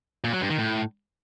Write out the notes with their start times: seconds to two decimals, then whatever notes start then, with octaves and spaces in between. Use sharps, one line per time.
0.24 A#2
0.33 F#3
0.41 G2
0.50 D#3
0.58 A2